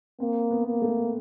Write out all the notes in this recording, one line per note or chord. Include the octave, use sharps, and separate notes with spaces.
A#3 C4
B3
A#3
A3